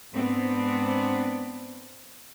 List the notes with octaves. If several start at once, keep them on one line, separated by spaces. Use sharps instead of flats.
G#2 B3 C4 D4